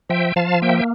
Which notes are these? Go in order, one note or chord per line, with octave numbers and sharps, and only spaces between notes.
F3 E5 G5
F3 F5 A5
A#3 E5 G5